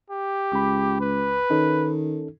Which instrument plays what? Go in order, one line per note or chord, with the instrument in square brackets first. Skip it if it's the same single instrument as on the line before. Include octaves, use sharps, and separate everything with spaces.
[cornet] G4
[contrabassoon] C#2 [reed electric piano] B5 D6
[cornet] B4
[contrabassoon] D#3 [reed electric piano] C#4 D#4 A4